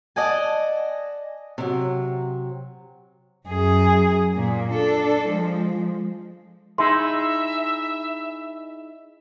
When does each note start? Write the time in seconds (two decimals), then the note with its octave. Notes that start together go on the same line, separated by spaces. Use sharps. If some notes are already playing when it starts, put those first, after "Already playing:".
0.16 D5 D#5 F#5 G#5 A5
1.58 C3 F#3
3.48 F#2 G#4
4.37 A#2 A#3
4.72 D4 A4
5.27 F3 G#3
6.78 D#4 E4 G#4 E5 C6